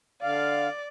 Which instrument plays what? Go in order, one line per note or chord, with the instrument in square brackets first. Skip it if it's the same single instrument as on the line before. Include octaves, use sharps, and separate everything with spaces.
[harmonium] D3 F5 [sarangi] D5